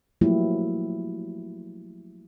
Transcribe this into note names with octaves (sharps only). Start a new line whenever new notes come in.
F3 F#3 A3 A#3 E4 G4